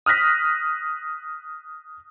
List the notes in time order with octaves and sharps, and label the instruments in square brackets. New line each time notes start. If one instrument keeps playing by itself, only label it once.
[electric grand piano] D#6 F6 F#6 A#6 B6